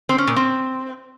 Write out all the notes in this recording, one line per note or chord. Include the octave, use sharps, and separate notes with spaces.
C4
C#4
A#2
C4